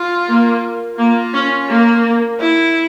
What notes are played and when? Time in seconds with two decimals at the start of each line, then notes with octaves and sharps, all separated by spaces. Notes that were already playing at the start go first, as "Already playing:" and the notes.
Already playing: F4
0.28 A#3
0.98 A#3 F4
1.33 C#4
1.69 A#3
2.40 E4